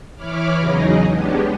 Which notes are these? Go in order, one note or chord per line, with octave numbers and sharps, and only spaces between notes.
E3 E4 C#5 B5 D6 F6
E2 C#3 F#3 D#4 G#4 D#5
G#3 B3 C#4 D4 G4